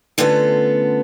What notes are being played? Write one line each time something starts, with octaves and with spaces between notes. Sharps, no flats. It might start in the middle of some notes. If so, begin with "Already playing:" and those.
D3 A3 B3 C#4 F4